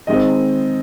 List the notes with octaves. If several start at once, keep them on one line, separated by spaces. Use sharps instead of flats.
D#3 G#3 C4 D#5